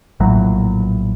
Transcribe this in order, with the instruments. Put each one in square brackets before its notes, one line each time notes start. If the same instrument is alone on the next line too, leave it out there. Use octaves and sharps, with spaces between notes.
[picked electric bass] A#1 A2 F#3